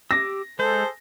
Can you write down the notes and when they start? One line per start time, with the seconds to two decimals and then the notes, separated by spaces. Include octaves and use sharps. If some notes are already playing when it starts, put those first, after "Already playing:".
0.11 G4 D6 E6 A#6
0.59 G#3 G#4 A4 C5 G6